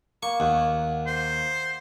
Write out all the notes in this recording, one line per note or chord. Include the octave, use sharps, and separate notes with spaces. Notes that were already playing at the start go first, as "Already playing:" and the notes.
A#3 C#6
D#2 F#5
C5